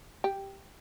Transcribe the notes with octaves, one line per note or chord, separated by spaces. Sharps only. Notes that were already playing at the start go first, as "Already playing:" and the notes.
G4